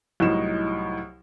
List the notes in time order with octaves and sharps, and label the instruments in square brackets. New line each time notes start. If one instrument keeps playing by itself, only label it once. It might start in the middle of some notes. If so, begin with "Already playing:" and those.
[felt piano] C2 A2 F#3 D#4 E7